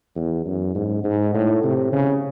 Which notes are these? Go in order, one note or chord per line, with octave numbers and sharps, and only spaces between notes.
E2
F#2
G#2
G#2
A2
C3
C#3